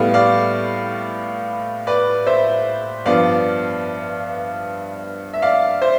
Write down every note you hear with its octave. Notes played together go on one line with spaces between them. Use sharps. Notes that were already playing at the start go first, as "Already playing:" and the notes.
Already playing: A2 G3 B3 F5
D5 F5
B4 D5
C5 E5
G2 F3 B3 D5 F5
E5
D5 F5
C5 E5